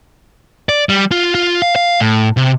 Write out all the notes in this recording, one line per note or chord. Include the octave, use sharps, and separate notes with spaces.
D5
G3
F4
F4
F5
F5
A2
C3